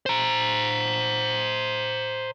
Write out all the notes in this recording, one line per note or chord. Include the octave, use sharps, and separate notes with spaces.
C5 A#5